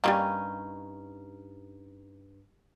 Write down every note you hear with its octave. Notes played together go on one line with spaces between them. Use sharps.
G2 G3 G#3 A#3 C#4 D#4